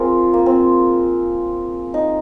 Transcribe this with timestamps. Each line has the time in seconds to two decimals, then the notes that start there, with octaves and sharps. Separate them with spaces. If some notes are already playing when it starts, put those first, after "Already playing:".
Already playing: C4 F4 G#4 A#4
0.33 A#3
0.46 C4
1.94 D#4